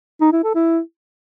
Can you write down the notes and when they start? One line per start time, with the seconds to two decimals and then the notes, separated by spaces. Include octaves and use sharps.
0.21 D#4
0.32 E4
0.44 A4
0.55 E4